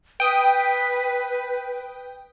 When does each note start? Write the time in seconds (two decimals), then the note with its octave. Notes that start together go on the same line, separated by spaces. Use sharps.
0.20 B4 G5 D#6